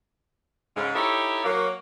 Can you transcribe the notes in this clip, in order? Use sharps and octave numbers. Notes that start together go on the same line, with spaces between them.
G#2 C#3
D#4 E4 G4 A4 C#5
F#3 A#3